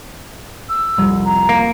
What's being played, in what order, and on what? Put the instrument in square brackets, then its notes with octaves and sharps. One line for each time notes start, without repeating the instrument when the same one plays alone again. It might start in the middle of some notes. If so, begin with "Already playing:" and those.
[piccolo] E6
[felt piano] C2 F2
[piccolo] A#5
[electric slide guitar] A#3